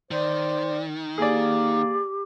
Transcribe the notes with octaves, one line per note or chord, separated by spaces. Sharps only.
D#3 C5 D5
A#3 G4 G#4 D5